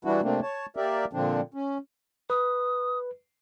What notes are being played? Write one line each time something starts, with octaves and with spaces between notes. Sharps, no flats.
E3 G3 D4 E4 F#4
C3 A3 A#3 C4 D4
C#5 A5
A#3 G4 A#4 D5 E5
A#2 D3 F3 C4 D4
C#4
B4 D#6